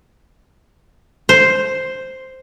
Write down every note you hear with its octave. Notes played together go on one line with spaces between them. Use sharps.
C5